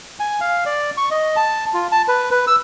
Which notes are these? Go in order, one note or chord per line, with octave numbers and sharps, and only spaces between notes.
G#5
F5
D5
C#6
D#5
A5
F4
A5
B4
B4
E6